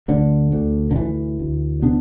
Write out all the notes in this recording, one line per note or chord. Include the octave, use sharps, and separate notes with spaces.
D2 D3
D2
D3
D2 E3
D2
C3 B3 D4